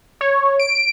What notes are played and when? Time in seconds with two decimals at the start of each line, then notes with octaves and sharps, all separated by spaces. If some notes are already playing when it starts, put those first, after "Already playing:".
0.21 C#5
0.60 D7